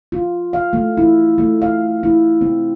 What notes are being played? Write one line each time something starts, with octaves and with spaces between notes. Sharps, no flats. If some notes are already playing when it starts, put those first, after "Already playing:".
F4
F5
A3
E4
A3
F5
E4
C4